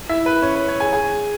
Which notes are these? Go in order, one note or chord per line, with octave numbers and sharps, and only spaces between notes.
E4 E5
B4
C#4 C#5
B4
C#4 C#5
G#4 G#5
G#4 G#5